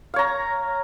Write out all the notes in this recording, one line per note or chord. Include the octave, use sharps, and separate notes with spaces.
C#5 F5 A#5